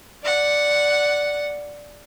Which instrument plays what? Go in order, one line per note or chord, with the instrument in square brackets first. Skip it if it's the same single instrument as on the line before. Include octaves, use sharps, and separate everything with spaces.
[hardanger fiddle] D5 F#5